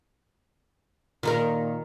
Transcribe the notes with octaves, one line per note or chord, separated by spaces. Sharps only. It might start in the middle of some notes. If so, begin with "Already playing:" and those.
A#2 D#3 D#4 A#4